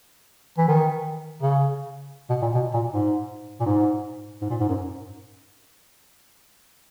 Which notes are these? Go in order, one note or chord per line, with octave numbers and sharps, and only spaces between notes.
E3
D#3
C#3
B2
A#2
B2
A#2
G#2
A#2
G#2
G#2
A#2
G#2
F#2